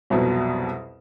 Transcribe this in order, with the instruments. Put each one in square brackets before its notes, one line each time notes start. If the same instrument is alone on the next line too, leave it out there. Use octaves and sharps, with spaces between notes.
[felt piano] C2 F2 B2 F#3 B4